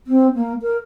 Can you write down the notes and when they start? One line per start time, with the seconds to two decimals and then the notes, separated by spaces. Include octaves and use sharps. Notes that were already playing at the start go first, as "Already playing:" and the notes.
0.07 C4
0.35 A#3
0.62 A#4